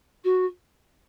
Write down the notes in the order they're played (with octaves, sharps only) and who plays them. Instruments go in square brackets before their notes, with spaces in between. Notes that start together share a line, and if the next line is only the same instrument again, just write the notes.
[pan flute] F#4